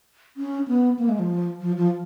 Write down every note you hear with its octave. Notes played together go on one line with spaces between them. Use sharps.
C#4
B3
A#3
G#3
F3
F3
F3